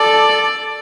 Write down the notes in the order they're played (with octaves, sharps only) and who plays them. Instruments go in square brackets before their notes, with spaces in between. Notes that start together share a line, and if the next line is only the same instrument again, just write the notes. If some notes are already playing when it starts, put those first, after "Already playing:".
Already playing: [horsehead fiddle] A4 [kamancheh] D5